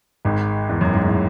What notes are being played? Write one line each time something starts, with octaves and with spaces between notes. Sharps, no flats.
G#1 G#2
E2
F#2
G#2
A2